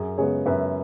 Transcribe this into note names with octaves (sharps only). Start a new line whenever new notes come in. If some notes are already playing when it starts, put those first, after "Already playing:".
Already playing: F#2 G#4
C#3 G#3 B3 G#4 C#5
F#2 B4 E5